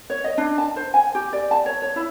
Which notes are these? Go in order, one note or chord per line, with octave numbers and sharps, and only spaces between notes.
C#5
D#5
D4
A5
C5
G#5
G4
D5
A5
C#5
C#5
E4